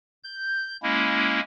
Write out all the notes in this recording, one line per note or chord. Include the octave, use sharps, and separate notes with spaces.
G6
G#3 A#3 C#4 E4